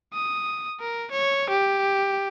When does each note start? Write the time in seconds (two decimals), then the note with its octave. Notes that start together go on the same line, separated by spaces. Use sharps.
0.14 D#6
0.80 A#4
1.11 C#5
1.49 G4